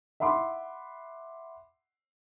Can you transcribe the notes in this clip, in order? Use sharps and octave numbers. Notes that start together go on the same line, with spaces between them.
E5 F#5 B5 C6 D6